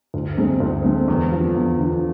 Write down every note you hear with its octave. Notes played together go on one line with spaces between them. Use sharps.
D2
D3 G#3 C4
D2
D3 G#3 C4
E2
D3 F3
E2
D3 F3